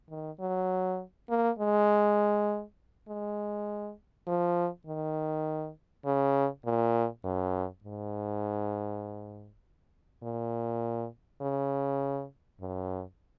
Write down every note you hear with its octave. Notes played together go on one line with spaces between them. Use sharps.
D#3
F#3
A#3
G#3
G#3
F3
D#3
C#3
A#2
F#2
G#2
A#2
C#3
F#2